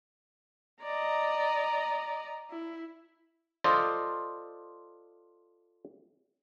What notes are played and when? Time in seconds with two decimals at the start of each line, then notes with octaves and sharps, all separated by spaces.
0.83 D5 D#5 A#5
2.50 E4
3.64 F4 A4 C5 D5 D#5